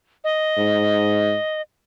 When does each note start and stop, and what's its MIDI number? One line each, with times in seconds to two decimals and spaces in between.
0.24 1.61 75
0.58 1.36 44